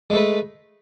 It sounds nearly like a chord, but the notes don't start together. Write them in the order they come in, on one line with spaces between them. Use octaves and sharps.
G#3 A3 B4